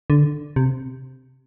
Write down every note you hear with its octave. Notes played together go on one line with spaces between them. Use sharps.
D3
C3